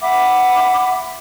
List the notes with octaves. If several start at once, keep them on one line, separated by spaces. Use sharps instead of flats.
E5 F#5 B5 D6